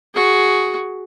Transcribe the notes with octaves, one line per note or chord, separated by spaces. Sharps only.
F#4 G#4